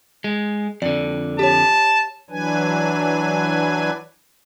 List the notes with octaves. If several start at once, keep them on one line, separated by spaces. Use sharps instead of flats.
G#3
F2 D3 D5
G4 C#5 A5
E3 F#3 D4 B4 G#5